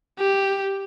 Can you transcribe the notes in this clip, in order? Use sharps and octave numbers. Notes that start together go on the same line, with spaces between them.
G4